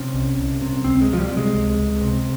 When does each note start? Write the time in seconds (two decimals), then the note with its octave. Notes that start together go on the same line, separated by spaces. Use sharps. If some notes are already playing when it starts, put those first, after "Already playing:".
Already playing: C3 C#4
0.14 C2
0.38 C2
0.61 C3
0.84 C#2 C4
1.01 G#3
1.07 C3
1.13 F3
1.20 G3
1.32 C3
1.37 G#3
1.54 C#2
1.78 C#2
2.01 C3